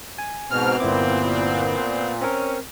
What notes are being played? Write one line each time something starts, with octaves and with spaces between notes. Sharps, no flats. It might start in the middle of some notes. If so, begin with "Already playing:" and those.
G#5
G#2 B2 B3 C4 F6
G1 A#2 E4 D6
C4 C#4 A#4